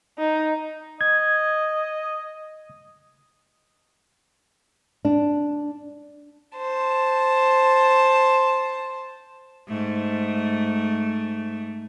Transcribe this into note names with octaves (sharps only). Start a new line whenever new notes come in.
D#4
D#5 G#6
D4
C5 A5
G#2 A3